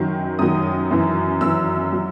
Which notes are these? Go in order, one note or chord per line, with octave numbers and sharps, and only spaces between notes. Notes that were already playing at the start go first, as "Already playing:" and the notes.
Already playing: F#2 D#3 F#3
F#2 D#3 F#3 D#6
F#2 E3
F#2 E3 E6
F#3